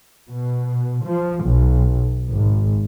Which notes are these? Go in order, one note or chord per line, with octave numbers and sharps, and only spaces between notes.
B2
F3
B1
G#1